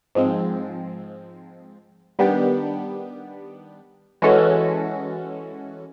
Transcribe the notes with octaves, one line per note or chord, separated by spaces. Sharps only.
G#2 F3 G#3 C4
D#3 G3 B3 D4 G4
E3 G#3 C#4 F#4 A4